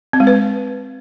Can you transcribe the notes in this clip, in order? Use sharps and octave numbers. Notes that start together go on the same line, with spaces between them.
C4
G#3
B4